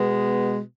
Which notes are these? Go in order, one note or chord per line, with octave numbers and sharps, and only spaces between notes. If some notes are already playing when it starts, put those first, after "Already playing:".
Already playing: B2 G#3 B3